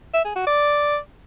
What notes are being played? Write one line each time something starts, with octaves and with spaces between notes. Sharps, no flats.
E5
G#4
F#4
D5